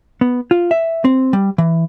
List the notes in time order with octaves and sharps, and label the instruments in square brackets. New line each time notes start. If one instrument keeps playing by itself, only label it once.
[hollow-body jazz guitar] B3
F4
E5
C4
G3
E3